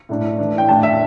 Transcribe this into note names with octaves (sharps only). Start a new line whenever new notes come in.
A2 A3 D4
E3 A3 D4
G5
A2 A3 D4 A5
E5